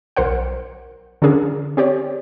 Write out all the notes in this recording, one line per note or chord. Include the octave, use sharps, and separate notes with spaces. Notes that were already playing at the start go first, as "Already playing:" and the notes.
B1 A#4 C5 F#5
D3 C#4 D4 G#4 A#4
C4 G4 C#5 D5